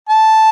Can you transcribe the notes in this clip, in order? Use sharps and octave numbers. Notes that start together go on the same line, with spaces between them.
A5